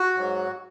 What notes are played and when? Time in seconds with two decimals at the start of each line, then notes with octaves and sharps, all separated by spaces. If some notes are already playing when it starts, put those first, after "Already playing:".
Already playing: F#4
0.15 G#2 F#3